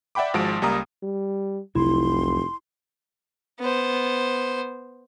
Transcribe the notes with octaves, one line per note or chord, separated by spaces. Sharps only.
D5 E5 F#5 G5 B5 D6
G#1 F3 G#3 F#4 A5 D7
C#2 G3 A#3 A#5 D#6
G3
F1 C2 C3 F#3 E4 C6
B3 C5